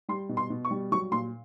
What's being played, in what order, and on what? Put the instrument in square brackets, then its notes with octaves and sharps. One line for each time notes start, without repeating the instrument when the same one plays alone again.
[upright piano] G3 C6
B2
C6
B2
C#6
G3
F#3 C#6
A#2 C6